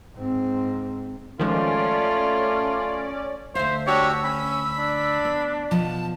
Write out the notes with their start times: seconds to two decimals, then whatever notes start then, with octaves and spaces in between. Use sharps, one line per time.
0.16 G#2 C4
1.39 D#3 F3 G#3 A3 C#4 F4 D5
3.55 D2 C5 E5 F5
3.87 D4 F#4 G4 C#5 E6
4.24 C#4 B5
4.79 D4
5.25 B3
5.71 B2 F3 A5